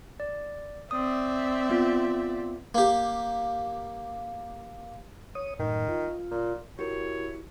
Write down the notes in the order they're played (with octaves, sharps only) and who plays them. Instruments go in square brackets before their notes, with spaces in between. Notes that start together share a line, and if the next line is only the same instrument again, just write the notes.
[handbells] D5
[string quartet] C4 D5 E5 [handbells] D#6
[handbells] B3 F4
[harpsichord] A#3 G4
[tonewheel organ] C#5 D#6
[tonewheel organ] F#2 A2 [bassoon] D#3
[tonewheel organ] F4
[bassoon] A#2
[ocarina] E4 [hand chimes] F#4 G4 A#4 [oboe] C#5